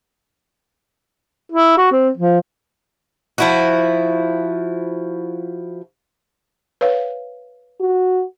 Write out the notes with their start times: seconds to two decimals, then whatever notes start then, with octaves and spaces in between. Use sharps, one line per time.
1.52 E4
1.77 F#4
1.92 C4
2.17 F3
3.38 F3 E4 F#4
6.81 B4 C#5 F5
7.80 F#4